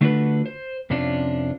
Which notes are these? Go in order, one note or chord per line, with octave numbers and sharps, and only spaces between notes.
D3 A3 D4 F4 F#4 B4
C5
F2 C3 C#4 D4 F4